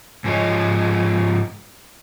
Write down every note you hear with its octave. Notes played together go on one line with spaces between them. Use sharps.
G#2 F3 G#4 C#5 D#5